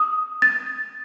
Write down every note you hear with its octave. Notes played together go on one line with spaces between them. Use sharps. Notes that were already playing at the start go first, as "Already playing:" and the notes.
Already playing: D#6
A6